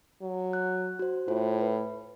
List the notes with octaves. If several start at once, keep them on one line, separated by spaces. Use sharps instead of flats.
F#3
F#6
F#4 C5
A2 F4 C5
B4